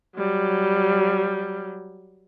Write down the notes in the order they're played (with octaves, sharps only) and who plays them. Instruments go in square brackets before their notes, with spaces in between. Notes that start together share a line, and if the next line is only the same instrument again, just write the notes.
[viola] F#3 G3